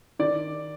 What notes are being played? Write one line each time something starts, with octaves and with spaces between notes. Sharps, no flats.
D#3 D5